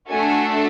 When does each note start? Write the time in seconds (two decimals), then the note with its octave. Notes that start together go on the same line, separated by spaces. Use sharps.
0.10 A3 D4 F#4 A4 G#5